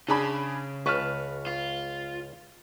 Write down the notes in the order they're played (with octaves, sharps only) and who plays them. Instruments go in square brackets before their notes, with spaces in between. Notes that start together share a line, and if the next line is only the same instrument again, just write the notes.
[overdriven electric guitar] C#3 [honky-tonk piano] D4 G#4 B5
[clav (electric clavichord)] C#2 B4 A5 [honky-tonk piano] C#6 F6
[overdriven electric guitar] F4